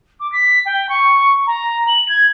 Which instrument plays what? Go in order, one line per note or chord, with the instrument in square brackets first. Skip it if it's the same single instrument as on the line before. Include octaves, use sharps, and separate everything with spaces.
[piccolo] D6
B6
G5
C#6
A#5
F#7
G#6